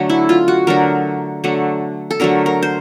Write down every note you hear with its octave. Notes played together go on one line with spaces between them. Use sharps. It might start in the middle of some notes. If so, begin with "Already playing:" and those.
Already playing: D3 F#3 A3
E4
F4
F#4
D3 F#3 A3 A#4
D3 F#3 A3
A4
D3 F#3 A3 A#4
A#4
C5